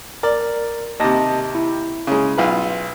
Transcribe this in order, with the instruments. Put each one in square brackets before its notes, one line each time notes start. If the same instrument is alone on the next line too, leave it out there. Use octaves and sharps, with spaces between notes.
[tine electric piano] A#4 [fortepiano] D5
[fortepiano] D#2 C3 [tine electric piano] D#5 A5 A#6
[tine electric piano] E4
[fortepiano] C#3 G#3
B1 F4 B4